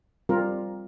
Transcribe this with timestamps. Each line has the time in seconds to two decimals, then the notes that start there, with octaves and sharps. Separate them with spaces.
0.29 G3 C4 F4 A#4